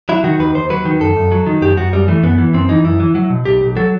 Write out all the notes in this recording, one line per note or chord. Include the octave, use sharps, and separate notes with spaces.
F#3 E4
D#3 F#4
D#2 B4
D#2 C5
F#3 B4
D#3
F#2 A4
F#2
F#3
D#3
F#2 G4
F#2 F#4
F#2 G3
E3 A3
F#2 B3
E3
F#2 C4
E3 D#4
F#2 E4
E3
F#3
B2
B1 G4
B1
F#3 A4